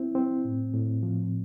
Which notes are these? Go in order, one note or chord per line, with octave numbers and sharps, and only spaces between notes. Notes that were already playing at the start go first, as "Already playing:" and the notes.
Already playing: C4 E4
C4
A2
A2
F3